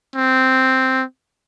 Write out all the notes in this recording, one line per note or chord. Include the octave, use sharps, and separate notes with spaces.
C4